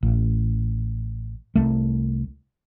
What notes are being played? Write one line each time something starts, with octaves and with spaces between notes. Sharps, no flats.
A1
C2 A3